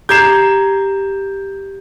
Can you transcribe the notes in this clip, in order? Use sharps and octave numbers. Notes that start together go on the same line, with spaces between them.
G4 A#5 G6 G#6 C7 E7